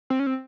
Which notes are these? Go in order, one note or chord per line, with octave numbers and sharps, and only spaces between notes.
C4
C#4
C4